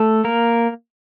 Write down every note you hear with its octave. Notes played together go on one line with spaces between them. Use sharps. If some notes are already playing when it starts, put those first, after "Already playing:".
Already playing: A3 A4
A#3 A#4